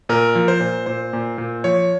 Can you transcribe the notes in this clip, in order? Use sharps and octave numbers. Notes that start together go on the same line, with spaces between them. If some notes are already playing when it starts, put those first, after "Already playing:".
A#2 A#4
F3
C5
A#2
A#2 C5
A#2
A#2
F3 C#5